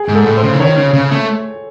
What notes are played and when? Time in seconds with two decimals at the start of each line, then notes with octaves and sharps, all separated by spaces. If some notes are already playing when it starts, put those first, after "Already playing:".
Already playing: G#4
0.09 G#2
0.15 A4
0.26 A2
0.37 C5
0.43 C#3
0.53 E3
0.59 D#3 C#5
0.77 C#3
0.93 C#3
1.11 A3